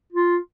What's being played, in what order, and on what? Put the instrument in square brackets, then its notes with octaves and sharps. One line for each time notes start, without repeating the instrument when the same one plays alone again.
[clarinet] F4